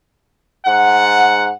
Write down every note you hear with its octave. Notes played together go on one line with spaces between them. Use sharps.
G#2 F#5